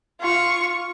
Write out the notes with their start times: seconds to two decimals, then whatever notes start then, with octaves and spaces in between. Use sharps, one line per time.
0.20 F4 C#6